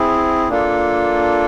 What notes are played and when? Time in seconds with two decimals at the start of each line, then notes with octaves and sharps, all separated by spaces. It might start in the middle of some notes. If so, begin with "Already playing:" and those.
Already playing: C4 E4 G#4
0.49 A#3 D4 F4 A4